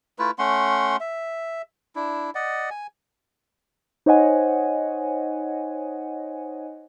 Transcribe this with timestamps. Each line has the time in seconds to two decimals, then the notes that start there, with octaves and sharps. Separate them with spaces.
0.19 A3 E4 F4 B4
0.39 A3 C#4 F#5 C6
1.00 E5
1.96 D4 E4
2.35 D5 D#5 F#5
2.70 G#5
4.06 D#4 C5 C#5 D#5 F#5 G#5